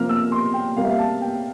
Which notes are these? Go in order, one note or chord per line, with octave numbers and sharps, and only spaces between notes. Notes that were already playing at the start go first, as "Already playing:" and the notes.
Already playing: C3 F3 A#3 F6
E6
C6
G5
C3 G3 A#3 F5
E5
F5
A5
G5